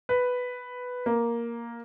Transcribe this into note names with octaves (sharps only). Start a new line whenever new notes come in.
B4
A#3